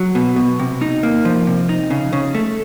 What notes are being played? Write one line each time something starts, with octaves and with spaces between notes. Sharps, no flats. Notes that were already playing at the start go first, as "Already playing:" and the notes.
Already playing: F#3
B2
B2
C3
D#4
A#3
F3
C3
D#4
C#3
C#3
A3